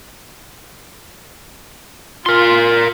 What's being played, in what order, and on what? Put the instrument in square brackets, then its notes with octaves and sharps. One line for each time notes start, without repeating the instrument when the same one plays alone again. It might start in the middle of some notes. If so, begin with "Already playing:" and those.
[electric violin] F4 [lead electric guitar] A#4 C6